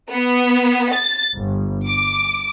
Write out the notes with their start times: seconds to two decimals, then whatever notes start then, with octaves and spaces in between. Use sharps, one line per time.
0.11 B3
0.94 A6
1.35 G1
1.88 D6